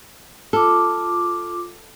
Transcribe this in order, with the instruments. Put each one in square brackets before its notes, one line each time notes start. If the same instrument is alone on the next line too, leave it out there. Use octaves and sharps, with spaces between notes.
[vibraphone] F4 D6 [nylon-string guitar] A4